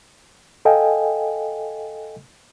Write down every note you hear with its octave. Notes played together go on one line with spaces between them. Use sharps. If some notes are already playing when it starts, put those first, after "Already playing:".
A4 D#5 F5 G5 G#5